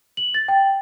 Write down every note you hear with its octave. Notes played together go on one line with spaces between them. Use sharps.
F#7
A6
G5